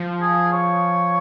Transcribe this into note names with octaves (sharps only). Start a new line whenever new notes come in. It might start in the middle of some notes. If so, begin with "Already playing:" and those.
Already playing: F3
G#4
C#5